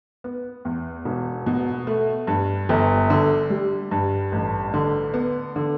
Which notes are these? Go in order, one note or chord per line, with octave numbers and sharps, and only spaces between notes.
B3
E2
E1
B2
A3
G2
G1
D3
G3
G2
A1
D3
B3
D3